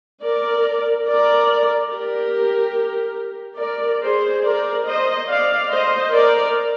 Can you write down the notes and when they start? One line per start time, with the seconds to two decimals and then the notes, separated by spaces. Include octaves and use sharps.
0.23 A#4 D5
1.07 A#4 D5
1.92 G4 A#4
3.60 A#4 D5
4.02 G#4 C5
4.44 A#4 D5
4.87 C5 D#5
5.29 D5 F5
5.71 C5 D#5
6.13 A#4 D5